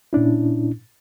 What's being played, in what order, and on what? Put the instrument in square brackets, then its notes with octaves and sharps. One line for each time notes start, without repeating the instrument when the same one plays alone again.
[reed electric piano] A#2 C#4 D4 E4